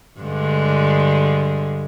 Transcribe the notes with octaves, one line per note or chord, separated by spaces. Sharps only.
G2 D3 G#3